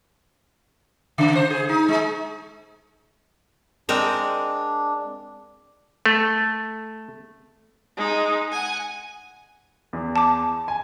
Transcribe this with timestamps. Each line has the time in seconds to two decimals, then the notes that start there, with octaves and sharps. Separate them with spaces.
1.18 C#3
1.35 C5
1.50 G#4
1.69 D#4
1.88 G#3
3.89 G#3 C4 D4 A#4
6.06 A3
7.97 G#3 D#4
8.52 F#5 G#5
9.93 E2
10.16 A5 D6
10.68 G#5